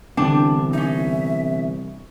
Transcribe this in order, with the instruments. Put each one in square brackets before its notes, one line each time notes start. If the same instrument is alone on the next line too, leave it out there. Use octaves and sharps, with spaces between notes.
[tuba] C2 [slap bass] D3 E3 B3 [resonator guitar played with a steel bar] D4 G5 A5
[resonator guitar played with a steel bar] C#4 D#4 [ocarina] E5